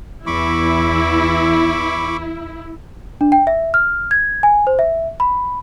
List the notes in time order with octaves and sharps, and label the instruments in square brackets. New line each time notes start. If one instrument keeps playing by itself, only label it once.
[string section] E2 [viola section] E4 [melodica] B5 C#6 D6
[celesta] D4
G5
E5
F6
G#6
G#5
C5
E5
B5